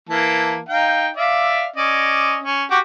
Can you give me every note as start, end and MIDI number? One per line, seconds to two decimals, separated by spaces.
0.10 0.59 52
0.10 0.59 58
0.10 0.59 81
0.69 1.08 63
0.69 1.08 77
0.69 1.08 79
1.17 1.66 74
1.17 1.66 76
1.17 1.66 77
1.77 2.38 61
1.77 2.38 74
1.77 2.38 75
2.44 2.64 61
2.71 2.79 66
2.71 2.79 67
2.71 2.79 86